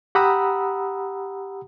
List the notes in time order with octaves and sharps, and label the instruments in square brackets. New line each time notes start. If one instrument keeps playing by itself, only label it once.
[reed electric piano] G4 F#5 A#5 B5 D#6 E6